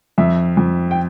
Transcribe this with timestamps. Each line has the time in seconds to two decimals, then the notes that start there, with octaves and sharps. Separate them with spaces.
0.18 F2 E5
0.57 F2
0.91 G5